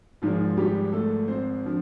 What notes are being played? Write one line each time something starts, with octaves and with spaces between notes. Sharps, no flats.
G#1 G#2 F3 G#3 F4
G3 G4
A3 A4
C4 C5
D3 F3